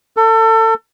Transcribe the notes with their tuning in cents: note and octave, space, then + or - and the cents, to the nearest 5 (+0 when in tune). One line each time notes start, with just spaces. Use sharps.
A4 +30